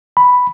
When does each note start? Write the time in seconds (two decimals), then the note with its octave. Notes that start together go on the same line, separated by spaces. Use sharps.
0.17 B5